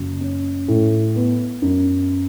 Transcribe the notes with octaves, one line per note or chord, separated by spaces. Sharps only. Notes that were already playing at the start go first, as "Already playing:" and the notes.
Already playing: F#1 F#3
C#4
A2
B3
F#2